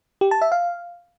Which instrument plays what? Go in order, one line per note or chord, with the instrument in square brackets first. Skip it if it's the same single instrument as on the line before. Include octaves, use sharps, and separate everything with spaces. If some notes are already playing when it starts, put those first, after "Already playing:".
[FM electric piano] G4
A5
E5
F5